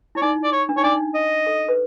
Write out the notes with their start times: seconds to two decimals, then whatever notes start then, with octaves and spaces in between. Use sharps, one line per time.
0.15 E4 C#5
0.22 D#4 D5
0.44 D5
0.52 C#5
0.69 D4
0.76 D#4 C#5
0.84 D4 D5
0.92 D#4
1.15 D#5
1.46 A4
1.69 B4